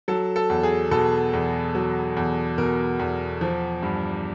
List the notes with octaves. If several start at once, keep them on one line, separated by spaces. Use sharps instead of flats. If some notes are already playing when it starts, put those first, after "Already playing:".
F#3 A4
A4
E2
G#4
B2 A4
E2
F#3
E2
B2 A#4
E2
F3
G2